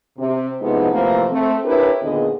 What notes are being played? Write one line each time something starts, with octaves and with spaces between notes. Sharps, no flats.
C3
A2 C3 F3 G#3 B3 D#4
C3 E3 F3 A3 A#3 C4
A3 C4
D4 E4 G4 A#4 B4 C#5
D#2 A#2 D3 B3 G#4 D#5